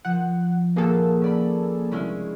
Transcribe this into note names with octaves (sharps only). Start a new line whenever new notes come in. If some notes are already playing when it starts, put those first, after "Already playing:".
F3 F#5
D#1 A#3 G#4 A4
C#4 D5 B5
C2 G#3 C#4 E4